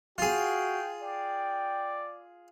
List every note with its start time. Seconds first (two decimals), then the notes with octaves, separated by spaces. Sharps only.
0.18 F4 F#4 G#4 G5
1.02 D5 G5